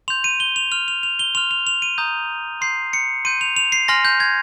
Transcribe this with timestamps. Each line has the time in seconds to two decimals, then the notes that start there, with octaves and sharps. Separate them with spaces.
0.08 C6 G6 F7
0.24 D#7
0.40 G7
0.56 F7
0.72 C6 F6 F7
0.88 F7
1.03 F7
1.19 G7
1.35 C6 F6 F7
1.51 F7
1.67 F7
1.82 D#7
1.98 A#5 D#6 G6
2.61 C6 G6 C7
2.93 C#7
3.25 C6 G6 D#7
3.41 F7
3.56 F7
3.72 C7
3.88 G#5 C6 F6 A#6
4.05 G6
4.20 G#6